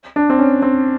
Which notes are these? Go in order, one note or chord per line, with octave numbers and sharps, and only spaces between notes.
D4
C4
C#4
C4